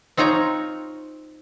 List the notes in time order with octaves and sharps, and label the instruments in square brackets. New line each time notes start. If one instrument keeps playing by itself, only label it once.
[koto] C4 D#4 F4 C#5 A#5